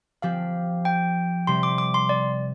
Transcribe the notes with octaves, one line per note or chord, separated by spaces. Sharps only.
F3 C4 G4 F5
G5
C3 G3 C4 G4 C6
D6
D6
C6
D5